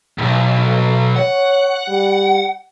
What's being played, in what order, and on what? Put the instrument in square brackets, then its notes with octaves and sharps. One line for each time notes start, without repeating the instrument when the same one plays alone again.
[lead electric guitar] B1 G#2
[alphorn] A4
[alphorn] C#5 [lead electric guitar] F#5
[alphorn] G3